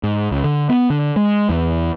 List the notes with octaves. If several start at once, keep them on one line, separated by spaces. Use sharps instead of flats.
G#2
C#2
D3
B3
D3
G#3
E2